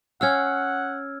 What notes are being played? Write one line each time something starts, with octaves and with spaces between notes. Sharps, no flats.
C#4 F5 F#5 E6 F6 G#6